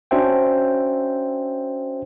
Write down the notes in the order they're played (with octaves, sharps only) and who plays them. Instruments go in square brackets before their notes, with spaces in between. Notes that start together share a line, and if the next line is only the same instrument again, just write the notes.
[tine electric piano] C#4 D4 F#4 C5 E5 G5